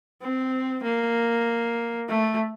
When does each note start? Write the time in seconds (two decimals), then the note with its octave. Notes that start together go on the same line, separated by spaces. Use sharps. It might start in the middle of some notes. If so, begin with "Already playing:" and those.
0.22 C4
0.83 A#3
2.08 A3